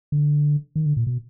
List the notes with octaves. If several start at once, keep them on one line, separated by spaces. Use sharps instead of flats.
D3
D#3
D3
A#2
B2